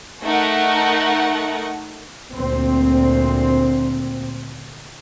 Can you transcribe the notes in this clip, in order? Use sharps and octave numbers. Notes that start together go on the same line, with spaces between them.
A3 D#4 A#4 F#5
D2 A#2 C4